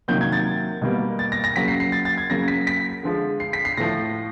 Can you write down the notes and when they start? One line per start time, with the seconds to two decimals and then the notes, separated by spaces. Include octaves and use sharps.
0.08 C3 D#3 F#3 A#3 G6
0.21 G#6
0.32 A6
0.82 B2 G3 A#3
1.19 A6
1.32 A#6
1.44 A#6
1.56 C#3 F#3 A#3 B6
1.68 C7
1.80 C7
1.92 A6
2.05 A6
2.18 G#6
2.30 C#3 F#3 A#3 A#6
2.48 B6
2.67 B6
3.03 D3 F3 G#3
3.40 C7
3.53 B6
3.65 C7
3.77 A2 F3 A3 A#6